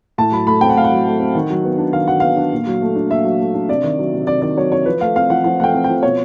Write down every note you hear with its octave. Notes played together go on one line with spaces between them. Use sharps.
A2 A5
F#3 B5
A3 B5
C4 G5
F#5
A2 F5
F#5
F#3
A3
C4
D#3
F#3
B3
D4
D#3 F5
F#3 F#5
B3 F5
D4
A#2
F#3
A3
D4
A#2 E5
F#3
A3
D4
C3 D5
D#3
F#3
C3
C3 D5
D#3 D5
F#3 C#5
C3 C#5
F3 B4
A3 F5
C4 F5
F3 F#5
F3 F#5
A3 F#5 G5
C4
F3 G5
B2 C#5